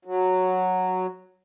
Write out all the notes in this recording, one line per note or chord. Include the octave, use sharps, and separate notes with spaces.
F#3